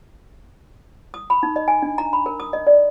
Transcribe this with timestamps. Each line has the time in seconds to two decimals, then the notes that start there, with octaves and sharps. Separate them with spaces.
1.14 D#6
1.30 B5
1.43 D#4
1.56 D#5
1.68 G#5
1.82 D4
1.98 A#5
2.13 B5
2.26 A#4
2.40 D#6
2.53 D#5
2.67 D5